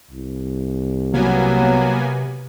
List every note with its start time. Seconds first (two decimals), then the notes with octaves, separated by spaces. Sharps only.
0.11 C2
1.13 C3 F#3 A#3 B3 G#5